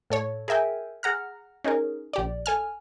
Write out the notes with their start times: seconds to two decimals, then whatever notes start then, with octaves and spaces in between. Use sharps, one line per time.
0.10 A2 A4 C#5
0.48 G#4 A#4 E5 G5 G#5
1.03 G#4 F#5 A#5 F6
1.64 C#4 D#4 G#4 A#4
2.13 A#1 G4 D5
2.46 A4 G#5 F6